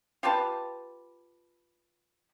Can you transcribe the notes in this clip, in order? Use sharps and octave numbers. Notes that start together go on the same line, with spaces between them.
F4 G4 B4 A5